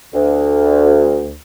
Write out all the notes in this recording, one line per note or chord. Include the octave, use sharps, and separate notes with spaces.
D2